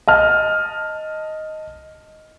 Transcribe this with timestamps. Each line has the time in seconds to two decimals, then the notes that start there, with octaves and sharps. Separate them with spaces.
0.07 D#5 A5 F6